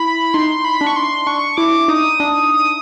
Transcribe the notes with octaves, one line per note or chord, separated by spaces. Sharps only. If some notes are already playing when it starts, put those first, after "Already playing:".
Already playing: E4 B5
D#4 C6
B5
D4
C#6
C6
D4 C#6
E4 D6
D#4 D#6
D4